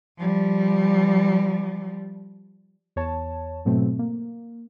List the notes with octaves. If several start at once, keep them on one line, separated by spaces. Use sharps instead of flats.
F3 G3
E2 C#5 A5
G#2 B2 F#3 A3 C4
A#3